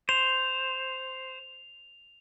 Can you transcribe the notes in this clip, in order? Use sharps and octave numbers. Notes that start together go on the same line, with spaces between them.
C5 F7